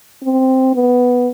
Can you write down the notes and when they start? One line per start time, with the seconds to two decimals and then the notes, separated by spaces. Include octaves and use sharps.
0.23 C4
0.75 B3